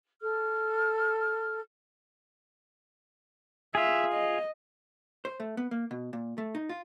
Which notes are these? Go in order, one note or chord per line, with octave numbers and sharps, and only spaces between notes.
A4 F6
F4 G#4 E5
D#5
C5
A3
B3
A#3
B2
A#2
A3
D#4
F4